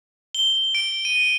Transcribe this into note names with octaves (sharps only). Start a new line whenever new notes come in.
G7
D7
D#7